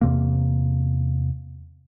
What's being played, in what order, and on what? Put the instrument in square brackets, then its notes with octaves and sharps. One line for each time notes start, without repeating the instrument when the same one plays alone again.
[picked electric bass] E2 C3 A#3